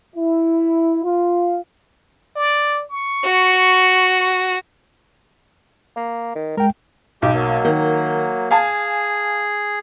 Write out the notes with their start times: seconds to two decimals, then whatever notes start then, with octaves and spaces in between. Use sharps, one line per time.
0.15 E4
1.04 F4
2.36 D5
2.91 C#6
3.25 F#4
5.96 A#3
6.35 D#3
6.57 G#3 A#4 G5
7.22 B1 G#3 G4
7.34 F#3 A#3
7.65 D#3
8.51 G#4 F5 G#5 A5